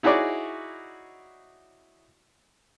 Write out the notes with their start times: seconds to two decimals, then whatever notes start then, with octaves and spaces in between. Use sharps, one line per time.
0.03 D#4 E4 F#4 G#4 C#5 D5